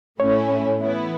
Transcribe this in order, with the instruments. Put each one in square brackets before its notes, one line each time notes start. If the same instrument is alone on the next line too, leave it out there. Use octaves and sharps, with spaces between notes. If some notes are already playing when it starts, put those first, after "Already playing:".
[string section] A2 A3 C#4 E4 [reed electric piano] C#5
[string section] E3 B3 E4